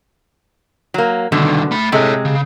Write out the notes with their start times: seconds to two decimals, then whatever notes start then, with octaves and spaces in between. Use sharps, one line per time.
0.94 F#3 A#3
1.32 C2 B2 D3 D#3
1.71 A3 B5
1.92 C3 G#3 A4 C#5
2.25 C#3